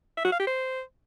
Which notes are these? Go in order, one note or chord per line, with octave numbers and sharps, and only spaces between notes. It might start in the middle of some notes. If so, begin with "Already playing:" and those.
E5
F#4
F5
G4
C5